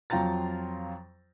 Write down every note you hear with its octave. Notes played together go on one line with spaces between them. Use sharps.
F2 F#3 F4 G5 A#5 A6